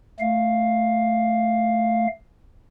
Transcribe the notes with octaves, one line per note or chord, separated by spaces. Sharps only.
A3 F5